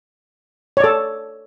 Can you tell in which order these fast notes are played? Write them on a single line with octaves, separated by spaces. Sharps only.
C#5 D5 A4